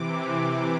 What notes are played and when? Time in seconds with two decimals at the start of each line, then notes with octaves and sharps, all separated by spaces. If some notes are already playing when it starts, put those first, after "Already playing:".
Already playing: C3 E3 D6